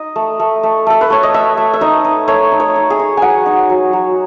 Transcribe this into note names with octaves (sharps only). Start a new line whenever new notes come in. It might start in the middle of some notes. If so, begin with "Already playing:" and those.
Already playing: D#4 D#5
A3
A3
A3
A3 A4
B4
A3 C#5
D#5
A3 E5
A3
E5
D#4 D#5
D#4
A3 C#5
D#4
C#5
D#4
G#4
D#4
F#3 F#5 G#5
D#4
F#3
F#3